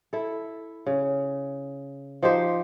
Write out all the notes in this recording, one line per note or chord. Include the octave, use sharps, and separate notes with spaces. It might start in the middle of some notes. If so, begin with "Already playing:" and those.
E4 A4
C#3
F3 D#4 G4 C5